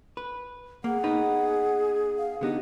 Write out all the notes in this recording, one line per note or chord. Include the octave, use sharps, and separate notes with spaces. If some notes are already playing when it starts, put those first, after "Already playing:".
B4
A#3 G#4 F#5
B3 D#4 B4
F5
D3 B3 D#4 G4